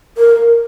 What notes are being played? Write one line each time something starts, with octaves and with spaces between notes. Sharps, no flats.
A#4